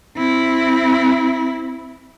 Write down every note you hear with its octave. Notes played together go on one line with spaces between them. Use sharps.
C4 E4